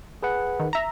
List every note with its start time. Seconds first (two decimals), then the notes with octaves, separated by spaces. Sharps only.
0.23 G#4 B4 F#5
0.60 D#3
0.73 E5 A#5